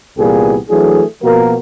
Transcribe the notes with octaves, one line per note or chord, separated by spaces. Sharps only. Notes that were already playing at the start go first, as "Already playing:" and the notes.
C2 A#2 E3 B3 G4 G#4
E3 F#3 A3 D4 G#4
B2 F3 A#3 F#4 A#4